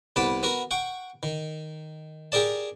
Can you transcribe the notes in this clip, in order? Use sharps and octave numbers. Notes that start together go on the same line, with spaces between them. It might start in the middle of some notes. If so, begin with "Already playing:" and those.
C2 B3 B4 A5 D6
B3 F#4 A#4
F#5 G5 C#6
D#3
G4 G#4 A#4 D5 A5